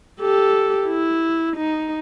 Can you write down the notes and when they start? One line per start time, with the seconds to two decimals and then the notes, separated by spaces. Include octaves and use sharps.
0.21 G4 A4
0.87 E4
1.57 D#4